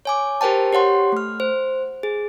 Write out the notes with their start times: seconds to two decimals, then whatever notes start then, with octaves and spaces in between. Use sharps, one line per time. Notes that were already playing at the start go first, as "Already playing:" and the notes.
0.05 C#5 G#5 D6
0.41 G4 A#4 C5 G5 A5
0.73 G4 C#5 F#5 C6
1.12 A3 F6
1.40 C5
2.03 G#4